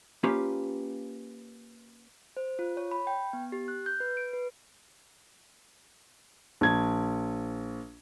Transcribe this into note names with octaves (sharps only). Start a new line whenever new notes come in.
A#3 C#4 F4 G4 B4
C5
F4
C#5
B5
G5
B3
G4
F#6
G6
B4
D7
B4
A#1 G#6